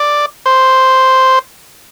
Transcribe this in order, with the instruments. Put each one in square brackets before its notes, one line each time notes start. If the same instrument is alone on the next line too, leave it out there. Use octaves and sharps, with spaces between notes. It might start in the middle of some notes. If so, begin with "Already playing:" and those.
Already playing: [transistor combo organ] D5
C5